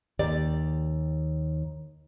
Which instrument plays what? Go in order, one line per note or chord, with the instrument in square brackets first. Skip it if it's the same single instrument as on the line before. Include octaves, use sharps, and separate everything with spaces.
[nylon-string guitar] D#2 G4 D5